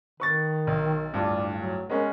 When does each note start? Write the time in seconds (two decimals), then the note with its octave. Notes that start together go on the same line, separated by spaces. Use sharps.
0.20 D#3 B4 C#6 A6
0.67 B1
1.13 D1 G2 D4 F4
1.55 F#3
1.89 G#3 B3 C#4 A#4